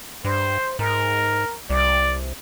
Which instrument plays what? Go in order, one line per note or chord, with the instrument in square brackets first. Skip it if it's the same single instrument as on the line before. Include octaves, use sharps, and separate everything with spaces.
[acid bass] G2 [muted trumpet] C5
[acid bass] G#2 [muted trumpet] A#4
[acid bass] C2 [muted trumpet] D5